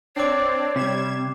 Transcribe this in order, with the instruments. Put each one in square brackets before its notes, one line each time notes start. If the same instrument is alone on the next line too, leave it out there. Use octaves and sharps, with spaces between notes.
[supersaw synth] C4 D4 D5 [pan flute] C#5 [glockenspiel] D6 C7
[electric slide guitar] C3 [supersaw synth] G3 G#6 E7